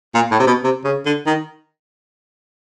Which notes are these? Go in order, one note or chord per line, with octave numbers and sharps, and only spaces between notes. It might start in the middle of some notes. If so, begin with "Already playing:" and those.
A#2
A2
C3
B2
C3
C#3
D3
D#3